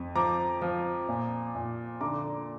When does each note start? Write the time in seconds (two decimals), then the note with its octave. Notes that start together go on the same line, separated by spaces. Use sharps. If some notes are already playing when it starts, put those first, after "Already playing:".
Already playing: F2
0.15 F3 A#5 D6
0.62 F3
1.08 A#2
1.55 A#2
2.01 D3 A#5 D6